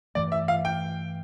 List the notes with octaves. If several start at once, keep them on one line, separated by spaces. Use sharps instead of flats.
G2 E3 A3 D5
E5
F5
G5